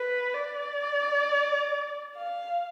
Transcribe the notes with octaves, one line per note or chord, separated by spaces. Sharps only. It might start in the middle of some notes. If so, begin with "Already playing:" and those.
Already playing: B4
D5
F5